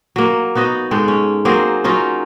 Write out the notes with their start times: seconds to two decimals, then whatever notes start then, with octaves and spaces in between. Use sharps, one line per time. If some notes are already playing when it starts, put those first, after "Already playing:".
0.16 F#3 A#3
0.55 B3 D#4 F#4 D#5
0.91 G#2 G#3 A4 G5
1.08 C#4
1.45 F#3 A#3 C4 G#4
1.84 F#3 C#4 D#4 F4